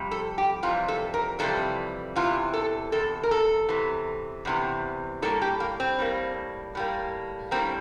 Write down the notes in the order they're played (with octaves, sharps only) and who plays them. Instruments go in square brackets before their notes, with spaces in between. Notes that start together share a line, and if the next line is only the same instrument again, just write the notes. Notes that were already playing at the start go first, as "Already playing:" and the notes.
Already playing: [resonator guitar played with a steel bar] F2 C3 G3
A4
G4
F2 C3 E3 G3 F4
A4
A#4
F2 C3 E3 G3 A4
E2 C3 E3 F4
A4
E2 C3 A4
A#4
A4
E2 C3 E3
E2 C3 E3
A2 G3 A#3 A4
G4
A#3
C4
A2 G3 A#3
A2 G3 A#3
A2 G3 A#3 C4